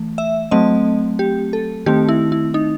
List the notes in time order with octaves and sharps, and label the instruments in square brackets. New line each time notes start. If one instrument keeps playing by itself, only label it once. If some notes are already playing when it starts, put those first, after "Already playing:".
Already playing: [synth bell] E3 A3
E5
F#3 A3 C4 D#5
G4
A4
D#3 A3 C4 G4
E4
E4
D#4